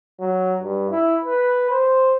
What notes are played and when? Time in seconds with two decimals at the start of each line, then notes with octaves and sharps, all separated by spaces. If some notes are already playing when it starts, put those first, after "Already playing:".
0.20 F#3
0.60 G2
0.91 E4
1.25 B4
1.71 C5